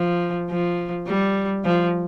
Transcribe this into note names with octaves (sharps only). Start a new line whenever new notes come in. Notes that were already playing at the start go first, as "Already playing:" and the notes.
Already playing: F3
F3
G3
F3